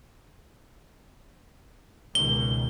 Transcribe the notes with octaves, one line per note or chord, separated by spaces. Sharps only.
C#2 B2 D#3 G7